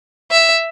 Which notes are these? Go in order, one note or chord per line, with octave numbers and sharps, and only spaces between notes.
E5